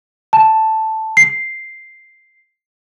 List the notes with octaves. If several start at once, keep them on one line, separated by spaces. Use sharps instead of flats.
A5
C7